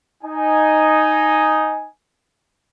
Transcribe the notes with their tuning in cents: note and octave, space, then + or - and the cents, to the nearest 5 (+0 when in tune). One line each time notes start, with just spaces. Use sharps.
D#4 +0 G#5 +0